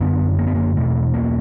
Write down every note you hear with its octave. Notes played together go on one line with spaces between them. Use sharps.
F#2 D3 B3
A#3
B3
A#3
E2 B2 A3
A#3